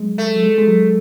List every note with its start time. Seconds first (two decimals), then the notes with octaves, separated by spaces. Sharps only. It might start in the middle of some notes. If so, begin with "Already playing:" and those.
Already playing: F#3 G#3
0.18 A3
0.36 F#3
0.42 G#3
0.58 G#3
0.67 F#3